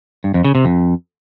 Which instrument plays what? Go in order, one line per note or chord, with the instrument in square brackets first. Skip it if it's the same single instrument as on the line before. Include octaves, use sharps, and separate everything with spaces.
[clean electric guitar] G2
F2
C#3
C3
F2